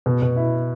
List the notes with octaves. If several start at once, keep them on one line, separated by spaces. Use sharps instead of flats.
B2
B2
E4